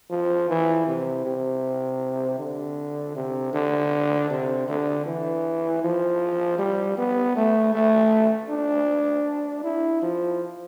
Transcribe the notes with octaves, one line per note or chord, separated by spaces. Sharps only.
F3
E3
C3
C3
D3
C3
D3
C3
D3
E3
F3
G3
B3
A3
A3
D4
E4
F3